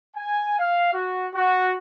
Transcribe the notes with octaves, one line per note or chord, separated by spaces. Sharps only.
G#5
F5
F#4
F#4